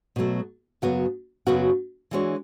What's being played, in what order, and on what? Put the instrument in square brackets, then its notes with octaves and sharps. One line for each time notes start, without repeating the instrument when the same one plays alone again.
[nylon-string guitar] B2 F#3 A3
F#2 C#3 F#3 B3 F#4
F#2 C#3 F#3 B3 F#4
E3 G#3 D4 F#4 C#5